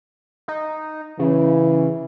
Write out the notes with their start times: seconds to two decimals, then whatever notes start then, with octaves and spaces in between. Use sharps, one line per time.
0.48 D#4
1.19 C#3 E3